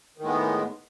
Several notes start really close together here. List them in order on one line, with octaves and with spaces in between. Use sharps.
D#3 A2 G#3 B3